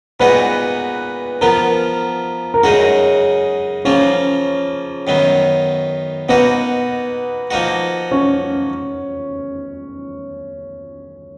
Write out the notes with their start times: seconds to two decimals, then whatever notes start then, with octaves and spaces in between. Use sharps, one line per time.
0.20 A#2 G#3 B3 D#4 F#4 B4
1.41 F3 B3 F4 A#4
2.54 A#4
2.63 F#2 C#3 G#3 D#4 F#4 G#4
3.85 C#3 F3 A#3 C#4 F4
5.07 F#2 D#3 F#3 B3
6.29 B2 A#3 B3 D#4 F#4
7.51 F3 A#3 D#4 F#4
8.11 C#4